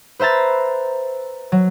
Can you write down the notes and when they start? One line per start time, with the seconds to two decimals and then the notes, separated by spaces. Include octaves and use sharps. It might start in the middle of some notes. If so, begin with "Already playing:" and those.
0.20 B4 C5 E5 A#5 A6
1.52 F#3